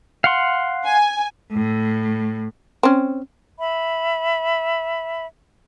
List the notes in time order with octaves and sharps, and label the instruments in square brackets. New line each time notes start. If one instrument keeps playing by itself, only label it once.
[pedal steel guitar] F5 F#5 C6
[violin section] G#5
[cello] A2
[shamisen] C4 C#4
[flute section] E5 B5